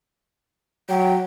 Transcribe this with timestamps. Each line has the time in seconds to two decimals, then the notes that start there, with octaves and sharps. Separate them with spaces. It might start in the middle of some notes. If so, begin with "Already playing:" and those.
0.89 F#3 G5